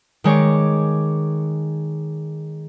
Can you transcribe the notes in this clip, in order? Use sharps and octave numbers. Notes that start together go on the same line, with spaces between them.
D#3 G#3 C#5 D6